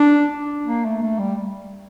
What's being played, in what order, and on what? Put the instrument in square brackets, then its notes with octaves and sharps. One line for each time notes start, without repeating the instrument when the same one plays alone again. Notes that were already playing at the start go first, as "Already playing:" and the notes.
Already playing: [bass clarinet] D4
A#3
A3
A3
G3